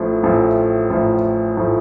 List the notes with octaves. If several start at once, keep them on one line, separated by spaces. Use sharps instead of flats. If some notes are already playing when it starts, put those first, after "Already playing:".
Already playing: A1 A2 F3
A1 A2 F3
A1 A2 F3
A2 F3